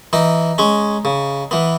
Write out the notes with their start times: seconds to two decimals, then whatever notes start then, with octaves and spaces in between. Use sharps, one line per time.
0.13 E3 D#4
0.58 G#3 C#4
1.05 C#3
1.51 E3 B3